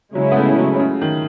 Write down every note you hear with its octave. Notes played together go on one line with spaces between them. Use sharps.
C#3 F#3 G#3 C#4 E4
B3
A3
F#3
C#3
D#3